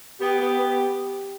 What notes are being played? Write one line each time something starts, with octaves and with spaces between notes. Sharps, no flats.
B3 G4
B3
B3